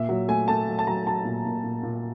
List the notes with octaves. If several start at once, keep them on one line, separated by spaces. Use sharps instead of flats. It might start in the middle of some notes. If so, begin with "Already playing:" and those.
Already playing: A#2 E5
F#3
A3 G#5
A3 A5
F#3
A5
F#3 A#5
F#3 A5
A#2
A#2
A#2
A#2